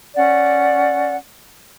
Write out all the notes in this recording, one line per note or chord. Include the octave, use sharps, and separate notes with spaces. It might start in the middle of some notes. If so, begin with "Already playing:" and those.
C#4 D5 F#5